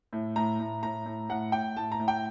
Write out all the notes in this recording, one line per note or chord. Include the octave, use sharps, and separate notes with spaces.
A2
A2 A#5
A2
A2 A#5
A2
A2 F#5
A2 G5
A2 A5
A#5
A2
G5